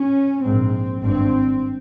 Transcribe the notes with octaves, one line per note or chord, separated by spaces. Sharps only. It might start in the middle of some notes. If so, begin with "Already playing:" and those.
Already playing: C#4
A#1 G#2 C4
G#1 G2 C4